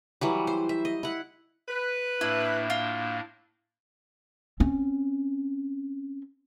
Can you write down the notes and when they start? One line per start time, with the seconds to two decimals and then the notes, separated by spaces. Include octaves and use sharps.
0.21 E3 F#3 G3
0.47 C5
0.69 E5
0.85 D#5
1.03 E4 F#5
1.69 B4
2.21 A2 A#3 D4 E4
2.70 F4
4.60 C4 C#4